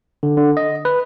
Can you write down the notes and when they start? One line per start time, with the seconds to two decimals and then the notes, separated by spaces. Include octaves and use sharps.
0.23 D3
0.37 D3
0.57 D#5
0.85 B4